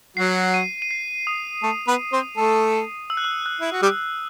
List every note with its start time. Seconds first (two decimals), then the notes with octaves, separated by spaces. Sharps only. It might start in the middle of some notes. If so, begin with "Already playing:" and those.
0.17 F#3 F#4 C7
0.54 D#7
0.82 D#7
0.91 C7
1.27 D#6
1.63 A3 A4
1.87 B3 B4
2.12 C4 C5
2.37 A3 A4
3.10 E6
3.17 F#6
3.24 E6
3.46 F#6
3.61 E4
3.72 F#4
3.82 G3 G4